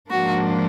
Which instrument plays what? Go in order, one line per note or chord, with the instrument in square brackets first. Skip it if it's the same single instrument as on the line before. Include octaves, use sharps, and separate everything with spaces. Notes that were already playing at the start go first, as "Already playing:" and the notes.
[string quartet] G#2 F3 A#3 D4 F#4